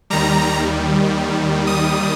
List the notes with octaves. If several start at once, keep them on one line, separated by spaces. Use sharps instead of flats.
D#2 D#3 G3 A#5
D#6